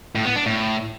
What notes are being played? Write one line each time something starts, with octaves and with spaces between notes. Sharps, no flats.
A2
B3
D4
A2